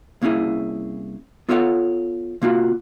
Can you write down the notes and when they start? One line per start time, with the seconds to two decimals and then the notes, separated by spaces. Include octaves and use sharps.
0.22 C2 A#3 C#4 E4 G#4
1.49 B3 F4 A4 C#5 D#5 F#5
2.42 C3 A#3 F4 F#4